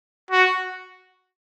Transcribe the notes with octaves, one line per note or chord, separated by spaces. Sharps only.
F#4